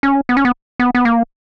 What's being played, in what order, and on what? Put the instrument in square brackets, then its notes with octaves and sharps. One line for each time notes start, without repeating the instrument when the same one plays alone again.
[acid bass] C#4
B3
C#4
B3
B3
B3
A#3